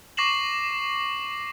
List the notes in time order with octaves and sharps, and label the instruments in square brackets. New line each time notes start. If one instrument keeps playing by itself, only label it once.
[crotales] C#6 D6 A#6 C7 E7 F#7